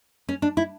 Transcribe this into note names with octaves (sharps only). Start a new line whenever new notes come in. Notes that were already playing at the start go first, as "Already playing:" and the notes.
C#4
D4
E4